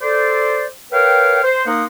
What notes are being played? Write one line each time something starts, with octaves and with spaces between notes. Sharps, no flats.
A4 C5 D5
A#4 B4 C#5 F5 G5
C5
A#3 D#4 A#4 F#5 C6 D#6